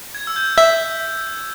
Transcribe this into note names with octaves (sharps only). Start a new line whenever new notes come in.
G#6
E6
G6
E5 G6